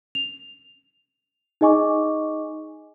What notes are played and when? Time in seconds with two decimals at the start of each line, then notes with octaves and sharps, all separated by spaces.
0.15 F7
1.61 D#4 G#4 D#5 G#5 C#6 D6